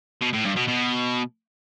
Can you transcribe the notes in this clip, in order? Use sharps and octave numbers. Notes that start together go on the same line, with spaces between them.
B2
A2
G2
B2
B2